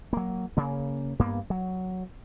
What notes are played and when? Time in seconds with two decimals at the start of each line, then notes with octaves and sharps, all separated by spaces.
0.13 F#3 A#3
0.57 C#3 A#3
1.19 G2 A#3 B3
1.50 F#3